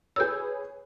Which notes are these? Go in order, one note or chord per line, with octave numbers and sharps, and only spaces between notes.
G#4 B4 C#5 E6 G6